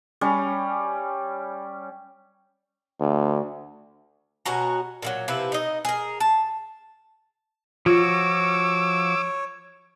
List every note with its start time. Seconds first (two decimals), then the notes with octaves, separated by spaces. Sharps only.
0.21 G3 C#4
3.00 D2
4.45 B2 C#4 F#4 A#5
5.02 A#2 E3 F#3
5.28 C3 F3 E4 B4
5.52 D#4 D#5
5.85 G#4 A#4
6.20 A5
7.86 F3 F4 F#4 C#5 D6 E6